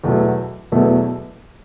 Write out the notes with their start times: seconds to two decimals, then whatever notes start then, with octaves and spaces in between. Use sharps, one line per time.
0.04 E2 B2 F#3 A3
0.72 E2 B2 F#3 A3